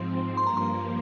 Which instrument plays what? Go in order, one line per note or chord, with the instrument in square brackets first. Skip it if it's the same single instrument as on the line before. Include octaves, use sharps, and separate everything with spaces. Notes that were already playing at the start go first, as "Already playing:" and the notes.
Already playing: [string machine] G#2 F3 C4 [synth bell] C6
[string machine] G2 F3 A#3 [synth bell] C6
[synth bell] A#5
C6